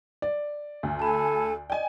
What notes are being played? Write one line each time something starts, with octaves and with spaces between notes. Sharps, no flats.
D5
D2
A4 G#5 A5 B5
D5 D#5 G5 G#5